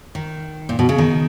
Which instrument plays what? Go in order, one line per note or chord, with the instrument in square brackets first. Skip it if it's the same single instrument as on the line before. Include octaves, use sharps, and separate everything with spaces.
[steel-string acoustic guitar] D#3
A#2
B2
C#3
D#3